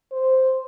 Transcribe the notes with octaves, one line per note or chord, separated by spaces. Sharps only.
C5